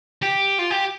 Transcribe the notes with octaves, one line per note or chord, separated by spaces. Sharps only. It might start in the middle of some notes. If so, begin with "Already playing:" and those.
G4
F4
G4